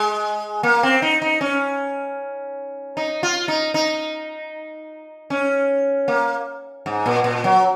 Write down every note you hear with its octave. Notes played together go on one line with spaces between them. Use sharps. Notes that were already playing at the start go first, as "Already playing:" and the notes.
Already playing: G#3
A#3
C4
D#4
D#4
C#4
D#4
F4
D#4
D#4
C#4
A#3
G#2
A#2
A#2
F#3